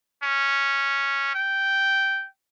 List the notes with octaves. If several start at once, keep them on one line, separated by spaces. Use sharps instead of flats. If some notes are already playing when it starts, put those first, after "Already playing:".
C#4
G5